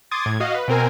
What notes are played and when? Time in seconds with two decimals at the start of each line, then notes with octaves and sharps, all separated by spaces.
0.11 C6 D6 D#6 G#6 A6
0.26 A2 G#6
0.40 F#4 D#5 F5
0.54 B4
0.68 B2 C4 A#4 G#5